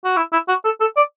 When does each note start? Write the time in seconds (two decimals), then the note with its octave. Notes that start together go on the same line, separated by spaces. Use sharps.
0.04 F#4
0.17 E4
0.32 E4
0.48 F#4
0.65 A4
0.80 A4
0.97 D5